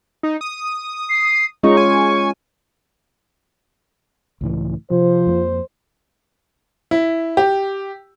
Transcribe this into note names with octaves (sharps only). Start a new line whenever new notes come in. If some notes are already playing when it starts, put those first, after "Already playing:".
D#4
D#6
C7
G#3 C#4 D#4 F4 C#6
G#5
C#2 A2 E3
C3 F3 C5
F2 G#3 A#3
E4
G4